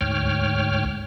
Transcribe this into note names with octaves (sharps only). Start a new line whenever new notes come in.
D2 G#2 C#5 G5 F6